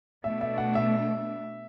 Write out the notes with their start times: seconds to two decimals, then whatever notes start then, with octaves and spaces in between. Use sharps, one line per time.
0.24 B2 A3 D4 E5
0.41 E5
0.58 F#5
0.75 E5